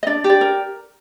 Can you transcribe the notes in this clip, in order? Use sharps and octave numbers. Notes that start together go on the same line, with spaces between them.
D#5
D4 D5
G4
D5
A#4